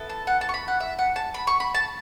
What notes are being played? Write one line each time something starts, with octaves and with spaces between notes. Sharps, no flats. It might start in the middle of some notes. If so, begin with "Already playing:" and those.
Already playing: B3 E4 A4
A5
F#5
A5
C#6
B5
F#5
E5
F#5
A5
B5
C#6
B5
A5